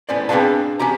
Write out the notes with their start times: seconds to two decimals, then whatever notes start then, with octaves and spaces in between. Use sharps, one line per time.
0.09 A2 B3 C#4 C5 D5
0.29 C4 D4 G#4 B4 F5 A5
0.79 C#4 F#4 G4 A#5